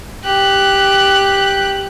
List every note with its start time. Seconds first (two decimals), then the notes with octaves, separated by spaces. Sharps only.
0.24 G4 F#6